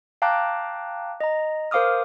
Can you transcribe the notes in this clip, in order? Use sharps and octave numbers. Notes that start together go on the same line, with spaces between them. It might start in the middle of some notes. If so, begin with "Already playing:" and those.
F5 G5 A5 A#5 D6 F#6
D#5 A#5
A#4 C5 F5 D6 D#6 F6